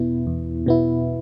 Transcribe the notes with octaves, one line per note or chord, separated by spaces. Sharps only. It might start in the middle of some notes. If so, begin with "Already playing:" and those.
Already playing: E2 B2 B3 E4
E2
B2 B3 E4